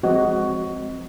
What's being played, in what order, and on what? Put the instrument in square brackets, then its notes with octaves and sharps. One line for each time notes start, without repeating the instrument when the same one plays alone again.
[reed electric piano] F3 G#3 C4 [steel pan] F#4 D#5